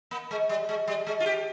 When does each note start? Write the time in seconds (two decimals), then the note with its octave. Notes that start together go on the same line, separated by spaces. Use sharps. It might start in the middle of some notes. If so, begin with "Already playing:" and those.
0.11 A#3
0.31 G#3
0.49 G3
0.69 G#3
0.88 G3
1.07 G#3
1.20 F4
1.26 G4